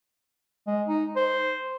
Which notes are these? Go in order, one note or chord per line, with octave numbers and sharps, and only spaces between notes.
G#3
D#4
C5